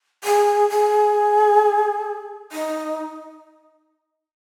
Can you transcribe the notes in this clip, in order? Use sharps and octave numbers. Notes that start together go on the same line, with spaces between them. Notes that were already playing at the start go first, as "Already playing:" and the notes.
G#4
G#4
D#4